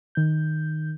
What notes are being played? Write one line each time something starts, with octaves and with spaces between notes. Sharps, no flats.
D#3 G6